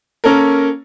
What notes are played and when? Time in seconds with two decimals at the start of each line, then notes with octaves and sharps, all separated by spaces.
0.24 A#3 C#4 A4 A#4